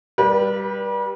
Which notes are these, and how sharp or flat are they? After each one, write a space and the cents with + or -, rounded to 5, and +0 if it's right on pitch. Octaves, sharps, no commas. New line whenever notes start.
G3 +0 B4 -35